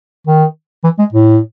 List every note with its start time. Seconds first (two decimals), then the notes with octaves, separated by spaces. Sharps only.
0.27 D#3
0.84 E3
0.99 G#3
1.13 A2